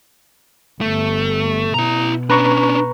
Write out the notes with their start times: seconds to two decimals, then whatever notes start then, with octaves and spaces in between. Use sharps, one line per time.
0.81 G1 A3
1.74 B2 E4 A#5
2.30 C#4 D4 B4 A#5 C#6